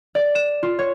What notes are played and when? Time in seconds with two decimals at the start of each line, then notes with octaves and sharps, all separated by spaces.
0.15 D5
0.35 E7
0.63 F4
0.79 C#5